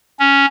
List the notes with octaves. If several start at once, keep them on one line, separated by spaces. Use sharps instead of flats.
C#4